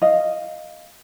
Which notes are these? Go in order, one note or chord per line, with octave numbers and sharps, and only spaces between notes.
D#5 F5